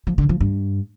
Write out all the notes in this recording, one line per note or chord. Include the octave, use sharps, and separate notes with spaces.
F3
D3
F3
G2